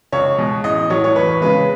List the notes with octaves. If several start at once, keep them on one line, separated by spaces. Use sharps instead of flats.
C#2 C#5
B2 G#3
A1 D#5
A2 F#3 C#5
C#5
E2 B4
C#3 G#3 B4